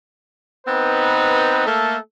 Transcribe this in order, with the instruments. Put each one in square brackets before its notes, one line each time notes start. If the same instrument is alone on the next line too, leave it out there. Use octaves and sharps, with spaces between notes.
[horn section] B3 C4 D#4 B4
A3 A#3 A4